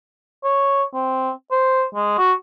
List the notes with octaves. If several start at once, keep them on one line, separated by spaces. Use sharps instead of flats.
C#5
C4
C5
G#3
F#4